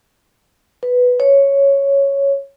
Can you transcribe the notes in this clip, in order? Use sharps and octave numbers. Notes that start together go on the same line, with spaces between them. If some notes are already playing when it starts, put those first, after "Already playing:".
B4
C#5